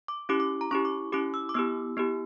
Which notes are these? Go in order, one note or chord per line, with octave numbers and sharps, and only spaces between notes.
D6
C#4 E4 G4 D6
D6
A#5
C#4 E4 G4 C#6
D6
C#4 E4 G4 D6
E6
D6
B3 E4 G4 E6
B3 E4 G4